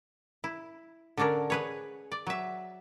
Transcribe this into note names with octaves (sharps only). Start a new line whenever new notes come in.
E4
D3 C#4 D4 A4 A#4
G#4 B4 C#5
D5
F#3 E5